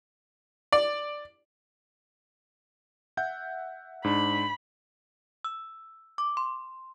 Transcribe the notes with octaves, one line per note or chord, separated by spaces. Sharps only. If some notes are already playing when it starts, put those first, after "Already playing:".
D5
E5 F#5 G6
G#2 D4 B5
E6
D6
C6